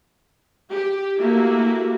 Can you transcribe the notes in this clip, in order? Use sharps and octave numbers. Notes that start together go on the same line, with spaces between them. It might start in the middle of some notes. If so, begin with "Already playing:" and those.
G4
A3 A#3 E4 F#4 G4